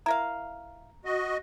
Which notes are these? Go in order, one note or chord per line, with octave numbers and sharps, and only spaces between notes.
E4 A#4 F5 A#5
F#4 D#5